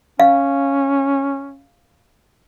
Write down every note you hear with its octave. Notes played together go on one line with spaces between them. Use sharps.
C#4 F5